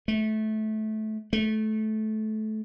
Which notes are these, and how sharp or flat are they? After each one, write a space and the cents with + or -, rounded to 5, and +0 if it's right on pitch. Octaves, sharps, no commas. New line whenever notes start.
A3 -20
A3 -20